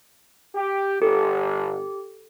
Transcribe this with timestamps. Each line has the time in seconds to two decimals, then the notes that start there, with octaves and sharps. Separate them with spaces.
0.55 G4
1.02 G1 G4 A4